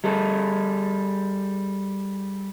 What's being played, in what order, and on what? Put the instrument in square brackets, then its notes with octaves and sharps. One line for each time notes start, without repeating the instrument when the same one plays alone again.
[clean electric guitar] G3 G#4 A4